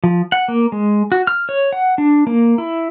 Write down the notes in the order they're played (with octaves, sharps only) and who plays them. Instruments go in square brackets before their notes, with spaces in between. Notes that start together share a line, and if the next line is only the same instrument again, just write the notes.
[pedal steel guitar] F3
F#5
A#3
G#3
F#4
F6
C#5
F#5
D4
A#3
E4